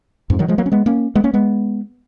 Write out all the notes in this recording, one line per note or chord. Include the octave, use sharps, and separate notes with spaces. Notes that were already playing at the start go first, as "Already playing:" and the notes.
F2 G#2
D#3 F#3
F3 G#3
F#3 A#3
C#4
G#3 B3
A#3 C#4
G#3 B3
A#3 C#4
G#3 B3